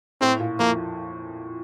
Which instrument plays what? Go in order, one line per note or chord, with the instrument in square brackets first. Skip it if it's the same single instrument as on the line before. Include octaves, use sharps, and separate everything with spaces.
[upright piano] A2 [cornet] C4
[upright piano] A#2
[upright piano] F2 [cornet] A#3